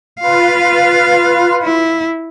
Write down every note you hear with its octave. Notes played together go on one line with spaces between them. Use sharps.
F4 B4 F5
E4